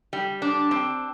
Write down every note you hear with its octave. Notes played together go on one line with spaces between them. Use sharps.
G3
D4
C4